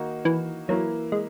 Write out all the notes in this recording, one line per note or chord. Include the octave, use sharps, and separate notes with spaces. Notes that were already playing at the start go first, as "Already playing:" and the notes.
Already playing: D#3 A#3 D#4 F#4
E3
E3 F#3 A#3 E4
G#3